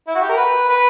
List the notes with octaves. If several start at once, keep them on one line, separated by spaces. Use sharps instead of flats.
E4
F#4
G4
A#4
B4
B4